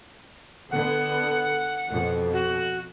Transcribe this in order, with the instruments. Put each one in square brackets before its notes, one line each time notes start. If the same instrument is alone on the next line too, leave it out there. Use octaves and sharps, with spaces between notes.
[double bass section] D3 B3 [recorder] F#5
[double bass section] F2 B2
[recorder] F#4